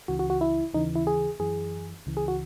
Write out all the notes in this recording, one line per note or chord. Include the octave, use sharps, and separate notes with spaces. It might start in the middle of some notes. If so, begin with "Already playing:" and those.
C#2 C#3 E3 F#4
F#4
F#4
E4
D#2 C#3 E3 D#4
E4
G#4
F#2 E3 G#4
C#2 C#3 E3
G#4
F#4